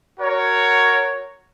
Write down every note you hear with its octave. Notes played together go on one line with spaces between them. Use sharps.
F#4 A#4 C#5